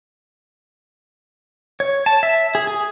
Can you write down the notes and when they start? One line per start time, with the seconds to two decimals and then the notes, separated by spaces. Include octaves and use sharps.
1.80 C#5
2.06 A5
2.23 E5
2.55 G#4
2.67 G#4